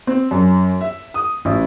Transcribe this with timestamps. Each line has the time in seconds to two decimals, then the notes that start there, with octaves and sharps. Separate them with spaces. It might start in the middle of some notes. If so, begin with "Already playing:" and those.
0.07 C4
0.31 F#2
0.81 E5
1.14 D#6
1.45 A1